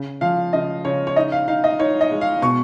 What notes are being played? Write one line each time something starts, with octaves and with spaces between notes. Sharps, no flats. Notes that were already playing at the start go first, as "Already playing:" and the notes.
Already playing: C#3
F3 F5
C#3 D#5
C#3 C#5
C#5
D#4 D#5
F5
D#4 F5
D#5
D#4 C#5
D#5
G#3
F5
B2 C#6